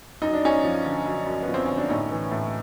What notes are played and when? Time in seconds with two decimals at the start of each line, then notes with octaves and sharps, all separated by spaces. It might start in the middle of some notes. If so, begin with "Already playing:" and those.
0.22 F#2 D#4
0.33 D4
0.43 F#2 C#4 D#4
0.63 F3
0.85 D3
1.06 F#2
1.26 F#2
1.42 B3
1.47 F3
1.54 C4
1.66 D3 C#4
1.78 D4
1.89 A2 C#4 D#4
2.10 E3
2.31 A2